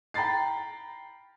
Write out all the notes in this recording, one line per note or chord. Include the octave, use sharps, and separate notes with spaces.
G5 A#5 B5 A6 C7